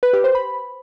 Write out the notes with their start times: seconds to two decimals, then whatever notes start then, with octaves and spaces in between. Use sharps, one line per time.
0.03 B4
0.13 G4
0.24 C5
0.35 B5